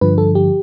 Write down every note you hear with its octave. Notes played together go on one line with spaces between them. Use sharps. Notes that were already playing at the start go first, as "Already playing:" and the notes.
G2 D3 F3 B4
A4
G4